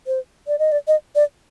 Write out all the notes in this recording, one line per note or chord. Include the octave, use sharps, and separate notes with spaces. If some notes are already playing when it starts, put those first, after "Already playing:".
C5
D5
D#5
D5
D#5
D5